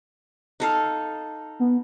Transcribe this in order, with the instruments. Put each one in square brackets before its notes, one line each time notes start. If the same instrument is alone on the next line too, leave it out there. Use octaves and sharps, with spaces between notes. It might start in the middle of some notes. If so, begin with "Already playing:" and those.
[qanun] D#4 A4 F5
[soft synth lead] B3